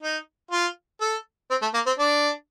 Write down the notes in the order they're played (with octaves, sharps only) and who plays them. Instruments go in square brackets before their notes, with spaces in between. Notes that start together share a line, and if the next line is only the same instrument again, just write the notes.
[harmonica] D#4
F4
A4
C4
A3
A#3
C4
D4